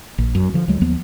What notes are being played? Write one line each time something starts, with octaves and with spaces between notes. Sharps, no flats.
A#1
F#2
D3 F3
D2 F#3 G#3
D#2 F3 B3